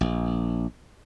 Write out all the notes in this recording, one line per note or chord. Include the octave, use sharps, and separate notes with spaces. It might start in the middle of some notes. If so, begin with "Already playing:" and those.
A#1